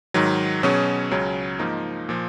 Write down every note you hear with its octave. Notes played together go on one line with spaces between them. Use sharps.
G#2 D#3 F#3
B2 F#3 C#4 G#4 C#5
C#2 C#3 F#3 C#4
G#2 F3 A#3 D#4
A#2 F3